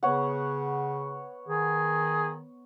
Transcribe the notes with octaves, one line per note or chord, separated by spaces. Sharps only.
C#3 B3 C#5 F#5
D#3 G#4